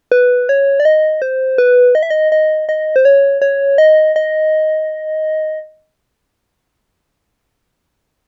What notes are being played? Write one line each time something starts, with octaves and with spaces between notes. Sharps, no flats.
B4
C#5
D5
D#5
C5
B4
D#5
E5
D#5
D#5
D#5
C5
C#5
C#5
D#5
D#5